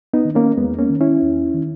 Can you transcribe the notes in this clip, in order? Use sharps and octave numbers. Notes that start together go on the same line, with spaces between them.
B3 D#4
D#3
A#3 C#4
E2 G#3 B3
A#3 C#4
D#3
C#4 E4
E2
D#3